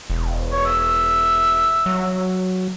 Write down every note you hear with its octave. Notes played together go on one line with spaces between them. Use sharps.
E1
C#5
E5
F#3